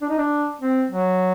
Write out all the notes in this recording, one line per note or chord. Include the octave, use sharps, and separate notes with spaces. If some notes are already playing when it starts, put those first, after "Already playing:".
D4
D#4
D4
C4
F#3